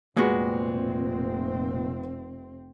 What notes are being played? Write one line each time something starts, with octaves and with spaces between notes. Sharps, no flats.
F1 A#2 G#3 B3 C4 F#4